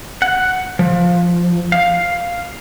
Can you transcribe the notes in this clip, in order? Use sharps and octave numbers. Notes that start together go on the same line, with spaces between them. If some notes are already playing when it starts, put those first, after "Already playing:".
F#5
F3
F5